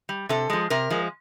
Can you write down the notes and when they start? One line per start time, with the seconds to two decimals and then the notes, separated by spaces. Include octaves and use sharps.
0.09 G3
0.29 C3 A4
0.50 F3 G#3
0.70 C3 A#4
0.90 F3 G#3